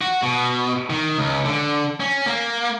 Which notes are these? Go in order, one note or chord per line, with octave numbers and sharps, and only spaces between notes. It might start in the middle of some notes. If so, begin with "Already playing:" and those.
F#4
B2
D#3
C#2
D3
C#4
A#3